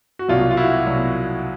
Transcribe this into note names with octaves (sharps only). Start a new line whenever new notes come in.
F#4
C2 B2 F#3 F4
F4
E4 F#4
C2 B2 F#3